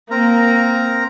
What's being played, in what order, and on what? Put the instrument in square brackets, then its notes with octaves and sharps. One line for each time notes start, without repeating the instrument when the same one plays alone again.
[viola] A#3 [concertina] C4 A#4 A#5